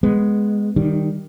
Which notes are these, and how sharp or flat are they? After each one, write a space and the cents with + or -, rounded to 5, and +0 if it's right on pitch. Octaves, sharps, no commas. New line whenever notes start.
G#3 +0 B3 +0
D#3 +0 G3 +0 D4 +45